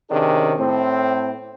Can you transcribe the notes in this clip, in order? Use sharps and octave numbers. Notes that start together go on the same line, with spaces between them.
C3 D#3 C#4 D4 G#4
A2 C4